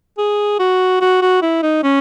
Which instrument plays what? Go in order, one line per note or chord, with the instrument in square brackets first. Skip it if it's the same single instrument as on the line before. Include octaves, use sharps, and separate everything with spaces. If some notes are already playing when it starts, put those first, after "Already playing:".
[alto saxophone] G#4
F#4
F#4
F#4
E4
D#4
C#4